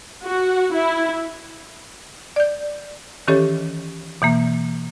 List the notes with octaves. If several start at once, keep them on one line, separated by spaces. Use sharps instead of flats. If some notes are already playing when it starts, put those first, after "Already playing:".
F#4
E4
D5 G6
D#3 E3 C#4 G4 A4 C#5
B2 E3 A#3